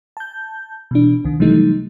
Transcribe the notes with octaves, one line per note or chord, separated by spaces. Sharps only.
A5 G6
B2 E3 D4
C2 D#3
C3 E3 F#3 G3 A3 D#4